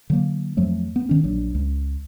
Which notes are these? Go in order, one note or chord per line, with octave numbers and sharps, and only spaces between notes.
D3 F#3 A#3
F2 F3 F#3 A3
B3
D#3 C#4
A#1 F#3 D4
C#2